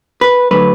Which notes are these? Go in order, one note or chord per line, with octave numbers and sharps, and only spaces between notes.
B4
D3 F#3 A3 B4